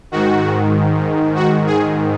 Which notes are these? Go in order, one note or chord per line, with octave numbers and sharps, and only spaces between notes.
G#2 D#3 F#4
F#4
G#4